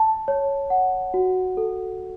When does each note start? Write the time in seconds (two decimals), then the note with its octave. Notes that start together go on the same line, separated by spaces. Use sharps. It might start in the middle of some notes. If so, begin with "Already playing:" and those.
Already playing: A5
0.28 C#5
0.70 F#5
1.14 F#4
1.57 A4